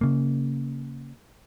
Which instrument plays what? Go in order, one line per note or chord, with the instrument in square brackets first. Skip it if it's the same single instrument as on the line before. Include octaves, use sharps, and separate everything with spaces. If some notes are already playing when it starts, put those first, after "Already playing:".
[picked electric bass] C#3 A#3